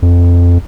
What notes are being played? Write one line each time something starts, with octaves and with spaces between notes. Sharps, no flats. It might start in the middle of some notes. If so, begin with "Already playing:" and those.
F2